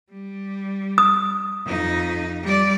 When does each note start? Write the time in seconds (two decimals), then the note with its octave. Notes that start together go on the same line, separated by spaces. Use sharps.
0.11 G3
0.98 D#6
1.65 F2 D#4
2.43 G3 D5